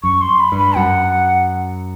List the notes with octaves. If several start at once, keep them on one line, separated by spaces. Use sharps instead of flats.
F#2 C#6
C6
B5
G2
B5
F#2 F#5